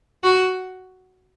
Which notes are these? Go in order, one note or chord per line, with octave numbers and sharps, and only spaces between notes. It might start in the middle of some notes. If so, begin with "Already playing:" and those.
F#4